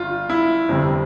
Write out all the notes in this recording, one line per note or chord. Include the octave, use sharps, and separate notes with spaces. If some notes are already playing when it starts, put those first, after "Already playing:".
Already playing: G1 F4
E4
G1 F2 C3 G3